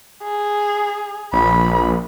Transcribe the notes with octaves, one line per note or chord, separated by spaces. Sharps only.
G#4
A#1 B5